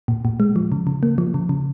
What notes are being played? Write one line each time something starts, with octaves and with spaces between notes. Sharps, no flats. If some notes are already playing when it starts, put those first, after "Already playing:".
A#2
A#2
G#3
F3
C#3
C#3
A#3
F3
C#3
C#3